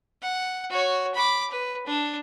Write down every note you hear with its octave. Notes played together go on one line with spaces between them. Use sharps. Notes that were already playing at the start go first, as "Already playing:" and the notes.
F#5
F#4 C#5
B5 D6
B4
D4